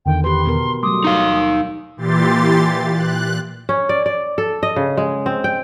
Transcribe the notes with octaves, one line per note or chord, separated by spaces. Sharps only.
E2 D3 D#3 G5
G4 B4 C6
B2 B3 A#4
F#3 G3 A3 C6 D6 D#6
D#4 F5
A#2 E3 G4 C6 A6
F#6
C#4
D5
D5
A4
D#5
C#3
G#3
C4
G5